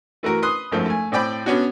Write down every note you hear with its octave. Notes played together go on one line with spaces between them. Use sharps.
E3 A3 F#4 A#4
B4 C6 D#6 F#6
G#1 F#2 F3 A3 C5
A3 G#5
A2 C4 D5 G5 B5
B3 C#4 D4 F#4